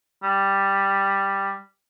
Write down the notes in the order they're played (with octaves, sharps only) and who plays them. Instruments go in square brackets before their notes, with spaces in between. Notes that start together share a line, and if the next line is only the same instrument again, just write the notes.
[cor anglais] G3